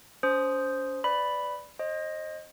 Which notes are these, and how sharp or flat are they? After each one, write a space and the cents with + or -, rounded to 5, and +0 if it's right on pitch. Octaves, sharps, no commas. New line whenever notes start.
C#4 +35 C5 +0 D#6 +0
B4 +30 D5 +0 B5 +0
C5 +35 D#5 +0